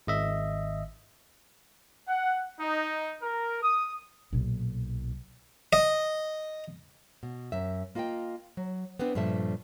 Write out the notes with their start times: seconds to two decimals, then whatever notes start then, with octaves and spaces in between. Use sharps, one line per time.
0.07 G#1 D#5 E5
2.08 F#5
2.60 D#4
3.22 A#4
3.63 D#6
4.33 B1 A#2
5.73 D#5
7.23 B2
7.52 F#2 E5
7.95 A#3 F4 D#5 F5 G5
8.57 F#3
8.99 B3 C4 D4 B4
9.15 G2 A#2 F3 A3 E5 A5